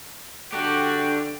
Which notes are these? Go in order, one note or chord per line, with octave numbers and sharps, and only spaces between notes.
D3 D4 F#4 G4 G5